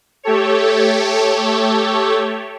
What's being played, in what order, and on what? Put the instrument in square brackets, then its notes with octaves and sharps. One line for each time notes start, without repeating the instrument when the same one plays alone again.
[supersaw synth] A3 G4 A4 C#5